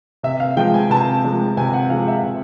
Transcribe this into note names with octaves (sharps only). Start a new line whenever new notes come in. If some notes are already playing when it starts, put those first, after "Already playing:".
C3 E5
F5
F3 G#3 G5
G#5
C3 A5
F3 G#3
C3 G#5
F#5
F3 G#3 F5
E5
C3